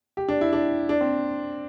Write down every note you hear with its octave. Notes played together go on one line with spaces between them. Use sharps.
G4
D4
E4
D4
D4
C4